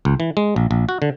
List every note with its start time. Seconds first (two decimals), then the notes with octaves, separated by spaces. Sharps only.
0.05 C#2
0.20 E3
0.37 G#3
0.56 A#1
0.71 A#1
0.89 F#4
1.02 D3